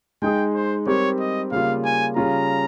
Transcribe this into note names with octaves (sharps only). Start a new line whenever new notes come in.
G#3 D#4 G#4 G5
C5
G3 C4 G4 A#4 C#5
D#5
C#3 G3 A#3 F4 F5
G#5
C#3 G3 C#4 F4 A#5